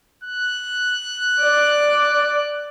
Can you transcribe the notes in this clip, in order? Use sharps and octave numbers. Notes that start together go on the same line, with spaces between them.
F#6
D5